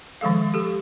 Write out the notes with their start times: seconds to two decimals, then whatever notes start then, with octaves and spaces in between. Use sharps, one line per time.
0.21 D#3 F3 G#3 A4 F5
0.54 G4 A4